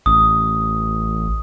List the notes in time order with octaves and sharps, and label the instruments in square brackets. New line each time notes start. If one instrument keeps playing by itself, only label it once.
[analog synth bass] A1 [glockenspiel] D#6